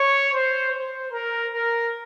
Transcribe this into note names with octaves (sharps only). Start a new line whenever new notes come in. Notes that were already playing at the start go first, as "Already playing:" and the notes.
Already playing: C#5
C5
C5
A#4
A#4